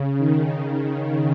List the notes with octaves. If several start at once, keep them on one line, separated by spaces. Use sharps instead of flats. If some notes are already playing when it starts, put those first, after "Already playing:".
Already playing: C#3
D#3